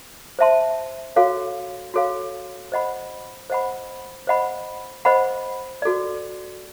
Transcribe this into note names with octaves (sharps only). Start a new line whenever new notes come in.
C5 E5 A5 C6
F#4 A4 C#5 F5
F#4 A4 C#5 F5
C5 D#5 F#5 B5
C5 D#5 F#5 B5
C5 D#5 F#5 B5
C5 D#5 F#5 B5
F#4 A4 D5